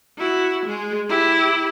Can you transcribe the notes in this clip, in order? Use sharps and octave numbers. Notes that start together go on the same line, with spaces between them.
E4 F#4
G#3 G#4
E4 G4